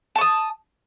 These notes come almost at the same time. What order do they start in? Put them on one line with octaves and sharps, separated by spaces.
A5 C#6 D#6